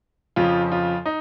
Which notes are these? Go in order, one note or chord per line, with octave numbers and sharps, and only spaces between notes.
F2 C#3 F3 F4
F4
D#4